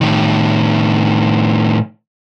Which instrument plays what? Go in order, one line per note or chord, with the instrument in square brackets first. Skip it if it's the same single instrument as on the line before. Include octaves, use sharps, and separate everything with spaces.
[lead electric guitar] A2 D#3